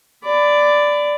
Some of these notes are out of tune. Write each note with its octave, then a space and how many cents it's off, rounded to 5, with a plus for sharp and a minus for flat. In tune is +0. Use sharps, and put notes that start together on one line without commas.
D5 +0 B5 +30